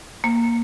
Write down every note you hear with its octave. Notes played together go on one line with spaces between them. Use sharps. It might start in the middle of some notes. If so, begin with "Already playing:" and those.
A#3